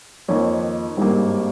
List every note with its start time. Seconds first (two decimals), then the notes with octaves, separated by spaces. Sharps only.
0.28 F2 D#3 A#3 C#5
0.97 G#1 G2 D#3 G3 A#3